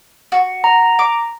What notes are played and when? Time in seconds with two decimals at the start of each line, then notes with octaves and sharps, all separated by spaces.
0.32 F#4
0.64 A#5
0.99 D6